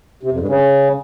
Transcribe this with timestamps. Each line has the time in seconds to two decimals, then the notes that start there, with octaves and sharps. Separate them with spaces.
0.23 C3
0.32 F2
0.40 G2
0.48 C#3